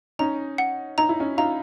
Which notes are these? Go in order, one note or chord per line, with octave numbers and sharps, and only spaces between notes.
C#4 D#4 A#5
F#5
D#4 A#5
E4
C#4 D#4
D#4 F4 A#5